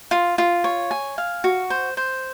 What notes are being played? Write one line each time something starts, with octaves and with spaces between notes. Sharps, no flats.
F4
F4
C#5
G#5
F5
F#4
C5
C5